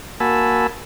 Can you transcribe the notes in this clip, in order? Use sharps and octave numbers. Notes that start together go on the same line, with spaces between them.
A#3 F#4 G#5 A5 B5 E6